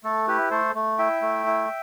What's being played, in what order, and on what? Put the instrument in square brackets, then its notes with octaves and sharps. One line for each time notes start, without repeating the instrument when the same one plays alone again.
[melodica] A3 A4
E4 G4 B4
A3 A4 C5
A3
E4 E5 G5
A3
E4